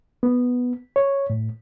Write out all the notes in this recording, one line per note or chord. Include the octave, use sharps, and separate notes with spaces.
B3
C#5
A2